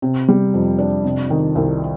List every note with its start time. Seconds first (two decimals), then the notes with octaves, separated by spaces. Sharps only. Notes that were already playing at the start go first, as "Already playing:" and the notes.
0.02 C3
0.28 G3
0.54 F2
0.79 D4
1.04 C3
1.30 D#3
1.55 C2